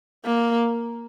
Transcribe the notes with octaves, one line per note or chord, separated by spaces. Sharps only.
A#3